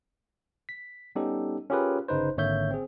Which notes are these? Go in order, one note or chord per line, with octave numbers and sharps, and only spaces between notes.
B6
G3 B3 C#4 D#4 G4 A4
C#4 F4 G4 G#4 A#4 B4
G1 C#3 D#4 B4 C5
G#1 D3 A#3 C#5 E5 G6
C4 G#4